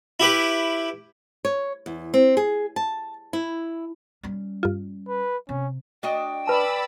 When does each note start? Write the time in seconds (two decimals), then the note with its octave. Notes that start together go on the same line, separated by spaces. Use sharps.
0.20 E4 G4 B4
1.45 C#5
1.86 E2
2.14 C4
2.37 G#4
2.76 A5
3.33 E4
4.23 G3 C#4
4.63 G2 F4
5.08 B4
5.49 C3 C#4
6.03 D4 F#4 D#5 G5
6.47 B4 D5 A5 B5 E6